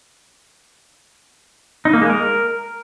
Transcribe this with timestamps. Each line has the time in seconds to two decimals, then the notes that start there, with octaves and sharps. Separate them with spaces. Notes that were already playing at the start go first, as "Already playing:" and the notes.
1.85 D#4
1.93 A#3
2.02 G#3
2.10 A#4